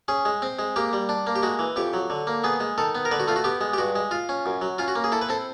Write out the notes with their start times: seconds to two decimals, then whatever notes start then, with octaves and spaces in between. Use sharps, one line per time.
0.08 C#4 G#4
0.25 G#3
0.42 C4
0.59 G#3
0.76 A#3 G4
0.93 G3
1.09 D4
1.27 A#3
1.36 G4
1.43 G#3 F#4
1.59 E3
1.76 F2 G4
1.94 F#3
2.10 D3
2.27 A#3
2.44 B3 G#4
2.60 G#3
2.78 D#3 A4
2.95 B3
3.05 A#4
3.11 D3 B4
3.20 F#4
3.28 A3 F4
3.36 F#4
3.44 B3 G4
3.61 G#3
3.73 G4
3.78 G2 F#4
3.95 G#3
4.11 F4
4.29 C#4
4.46 F#2
4.62 F#3
4.78 C#4 F4
4.88 F#4
4.95 A#3
5.04 G#4
5.12 E4 A4
5.21 B4
5.29 C4 A4